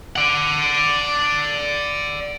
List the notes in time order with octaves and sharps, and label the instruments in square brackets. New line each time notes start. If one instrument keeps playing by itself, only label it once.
[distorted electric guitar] D5 F#5